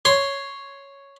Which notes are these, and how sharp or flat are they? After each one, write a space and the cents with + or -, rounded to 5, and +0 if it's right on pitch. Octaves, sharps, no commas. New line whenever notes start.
C#5 +0 C6 +0